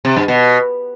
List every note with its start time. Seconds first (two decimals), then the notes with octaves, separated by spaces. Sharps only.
0.05 C3
0.16 G2
0.28 B2